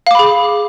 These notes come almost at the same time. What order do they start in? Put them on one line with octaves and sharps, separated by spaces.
F5 D6 B5 G#4